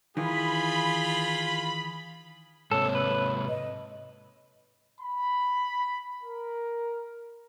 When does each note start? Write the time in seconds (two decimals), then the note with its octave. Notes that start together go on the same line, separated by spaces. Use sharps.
0.17 D#3 E3 F4 G#4 B5
2.71 G#2 C3 A4 C#5
2.95 B4
3.49 D#5
5.01 B5
6.24 A#4